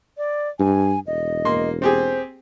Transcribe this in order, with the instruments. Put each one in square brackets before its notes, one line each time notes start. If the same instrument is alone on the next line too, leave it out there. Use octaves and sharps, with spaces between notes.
[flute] D5
[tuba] G2 [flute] G#5
[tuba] E1 [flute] D#5
[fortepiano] A#3 C6
[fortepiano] C4 G4 G#4 [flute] C5